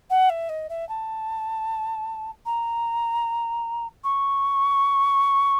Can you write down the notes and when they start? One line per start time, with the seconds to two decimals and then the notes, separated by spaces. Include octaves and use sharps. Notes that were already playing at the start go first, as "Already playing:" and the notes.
0.10 F#5
0.30 E5
0.49 D#5
0.69 E5
0.89 A5
2.46 A#5
4.04 C#6